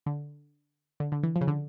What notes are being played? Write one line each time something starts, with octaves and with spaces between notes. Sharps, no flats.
D3
D3
D3
E3
F3
C#3
D3